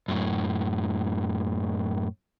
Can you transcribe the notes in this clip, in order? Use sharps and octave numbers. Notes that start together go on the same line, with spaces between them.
F#2 A2